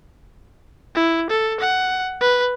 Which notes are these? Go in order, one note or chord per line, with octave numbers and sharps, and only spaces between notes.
E4
A4
F#5
B4